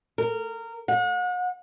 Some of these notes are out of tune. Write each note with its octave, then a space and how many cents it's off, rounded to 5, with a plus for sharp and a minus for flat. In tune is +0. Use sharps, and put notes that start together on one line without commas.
A#4 -20
F#5 -40